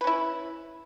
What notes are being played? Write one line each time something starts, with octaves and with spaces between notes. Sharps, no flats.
C#4 E4 B4